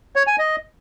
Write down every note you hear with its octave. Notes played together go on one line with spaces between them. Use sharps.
C#5
G#5
D#5